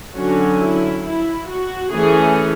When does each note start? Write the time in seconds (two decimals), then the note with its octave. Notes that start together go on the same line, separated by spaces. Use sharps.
0.15 D3 F#3 C#4 F#4
0.60 E4
1.04 E4
1.48 F#4
1.91 E3 A3 C#4 G#4